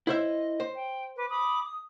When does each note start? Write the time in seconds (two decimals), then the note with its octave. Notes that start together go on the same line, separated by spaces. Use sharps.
0.07 E4 C5 D#5 E5
0.60 C5
0.76 G5
1.17 B4 D6
1.30 B5 D6 D#6
1.64 D#6